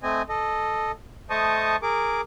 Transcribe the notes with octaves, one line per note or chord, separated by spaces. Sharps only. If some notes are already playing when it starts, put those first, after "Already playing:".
A3 C4 D#5 G#5
A4 D#5
A3 C5 D#5 A5 C#6 D#6
G#4 A#4 D6